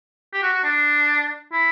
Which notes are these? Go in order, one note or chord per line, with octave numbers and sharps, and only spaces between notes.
G4
F#4
F#4
D4
E4